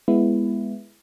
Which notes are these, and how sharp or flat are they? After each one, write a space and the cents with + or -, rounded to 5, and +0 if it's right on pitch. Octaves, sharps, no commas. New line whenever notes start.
G#3 +0 B3 +0 E4 +15